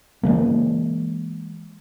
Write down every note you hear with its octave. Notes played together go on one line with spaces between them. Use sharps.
E3 G#3 A#3